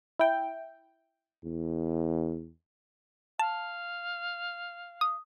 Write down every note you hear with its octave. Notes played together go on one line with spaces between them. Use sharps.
E4 G5
E2
F5 A5
D#6